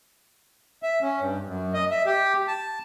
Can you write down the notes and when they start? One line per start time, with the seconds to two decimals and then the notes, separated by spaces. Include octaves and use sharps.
0.83 E5
1.02 C#4
1.20 G2
1.47 F#2
1.74 D#5
1.91 E5
2.06 G4
2.47 A5